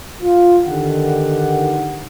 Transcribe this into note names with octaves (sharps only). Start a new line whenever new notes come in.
F4
D3 D#3 G4 F#5